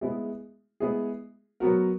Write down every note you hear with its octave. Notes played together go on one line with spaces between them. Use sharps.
G#3 B3 E4 G#4
G#3 B3 E4 G#4
F#3 B3 F#4 A#4